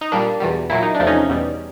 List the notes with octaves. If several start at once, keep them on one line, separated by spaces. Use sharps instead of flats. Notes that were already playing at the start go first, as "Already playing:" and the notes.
D#4
A#2 G3 A#3 D4
E2 B2 G3
A#2 F#3 A#3 E4
D#4
D4
E2 C3 F3 A3
C#4 D#4
E2 B2 G3